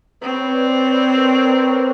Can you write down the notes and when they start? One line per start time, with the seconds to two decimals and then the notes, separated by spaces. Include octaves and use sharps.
0.21 C4 B4 C#5
0.54 C5 D5
0.84 B4 C#5
1.16 A#4 C5
1.39 B4 C#5
1.63 A#4 C5